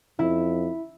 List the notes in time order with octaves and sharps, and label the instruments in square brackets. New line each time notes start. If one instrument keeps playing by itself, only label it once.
[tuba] F2 [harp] E4